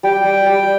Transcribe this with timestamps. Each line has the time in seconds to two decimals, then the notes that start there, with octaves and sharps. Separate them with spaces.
0.03 G3 G5
0.24 G3
0.46 G3